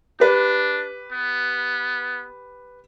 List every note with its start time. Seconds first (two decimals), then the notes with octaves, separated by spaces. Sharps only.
0.20 D4 G4 B4
1.11 B3